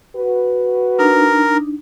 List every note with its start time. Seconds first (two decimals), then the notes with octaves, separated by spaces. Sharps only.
0.16 F#4 B4
0.99 D4 D#4 A#4